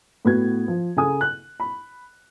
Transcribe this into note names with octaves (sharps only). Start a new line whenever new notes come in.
A2 B3 F#4 G#6
F3
C#3 A4 G#5 D#6
F#6
B5